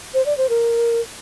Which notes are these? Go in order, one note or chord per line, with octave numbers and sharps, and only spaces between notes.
C5
D5
C5
A#4